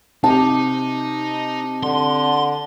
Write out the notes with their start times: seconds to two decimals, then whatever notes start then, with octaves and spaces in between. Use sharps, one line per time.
0.24 C3 D#4 G4 A5
1.83 D3 C6